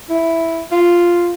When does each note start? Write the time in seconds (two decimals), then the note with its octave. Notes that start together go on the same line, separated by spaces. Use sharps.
0.10 E4
0.71 F4